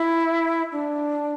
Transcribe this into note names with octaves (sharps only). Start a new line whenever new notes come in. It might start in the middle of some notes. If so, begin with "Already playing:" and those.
Already playing: E4
D4